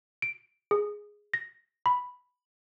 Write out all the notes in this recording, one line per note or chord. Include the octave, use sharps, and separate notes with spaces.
D7
G#4
A#6
B5